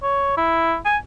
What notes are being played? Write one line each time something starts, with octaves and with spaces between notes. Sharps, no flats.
C#5
E4
G#5